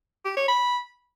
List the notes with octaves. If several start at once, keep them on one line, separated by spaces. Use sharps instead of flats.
G4
C#5
B5